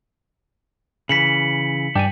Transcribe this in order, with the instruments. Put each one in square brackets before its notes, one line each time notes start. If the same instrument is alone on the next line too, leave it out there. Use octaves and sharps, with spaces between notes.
[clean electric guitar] C#3 E3 [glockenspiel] B6 C#7 F#7
[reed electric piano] G2 G5 [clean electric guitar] D4 D5 G#5